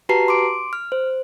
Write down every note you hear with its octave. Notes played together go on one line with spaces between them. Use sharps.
F#4 G4 B4 A5 A#5 C7
C6 D6 D7
F6
C5